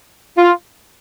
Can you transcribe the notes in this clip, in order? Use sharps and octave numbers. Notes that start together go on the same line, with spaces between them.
F4